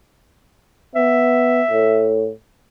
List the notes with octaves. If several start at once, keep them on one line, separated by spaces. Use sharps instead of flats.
B3 E5
A2